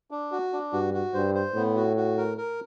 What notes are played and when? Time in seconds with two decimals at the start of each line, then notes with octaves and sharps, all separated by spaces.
0.11 D4
0.32 F#4
0.53 D4
0.73 G2 F#4
0.94 F#4
1.14 G2 C5
1.35 C5
1.55 A2 B3
1.76 F#4
1.97 F#4
2.17 A#4
2.38 A#4